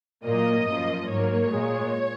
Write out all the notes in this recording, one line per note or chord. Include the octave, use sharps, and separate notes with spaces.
A#2 F#3 A#3 D#5
F#2 F3 A#3
G#2 F#3 A#3 C#5
A#2 G#3